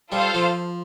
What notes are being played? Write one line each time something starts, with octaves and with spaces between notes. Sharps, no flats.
G3 F4 A4 C5 F5
F3